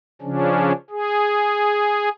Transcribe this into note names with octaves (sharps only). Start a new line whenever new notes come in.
C#3 F3 C#4 D4
G#4